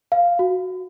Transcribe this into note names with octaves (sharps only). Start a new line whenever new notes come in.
F5
F#4